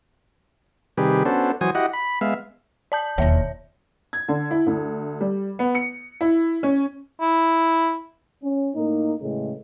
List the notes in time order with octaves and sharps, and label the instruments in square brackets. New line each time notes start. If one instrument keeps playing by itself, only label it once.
[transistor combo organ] C3 D#3 G3 G4 G#4 B4
B3 C#4 D4 F#4 A4 C5
E3 F#3 F#4 C5 G#5 D#6
E4 F#4 G4 D#5 F#5
B5
G#3 B3 E5 F5
[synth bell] D5 A5 G6
[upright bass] E1 D#2 [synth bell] C#5 E5
[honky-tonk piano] G#6
D3
E4
D2
G3
B3
C#7
E4
C#4
[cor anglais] E4
[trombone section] C#4
A2 A#3 D#4
A2 C#3 E3 G#3